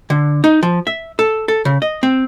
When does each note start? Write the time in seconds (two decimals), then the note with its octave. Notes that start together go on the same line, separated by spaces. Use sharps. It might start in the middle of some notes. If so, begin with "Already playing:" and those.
0.10 D3
0.44 D#4
0.63 F3
0.87 E5
1.19 A4
1.48 A4
1.65 C#3
1.82 D#5
2.03 C4